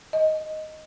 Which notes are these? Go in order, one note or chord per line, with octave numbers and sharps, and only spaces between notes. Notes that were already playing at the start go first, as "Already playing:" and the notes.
D#5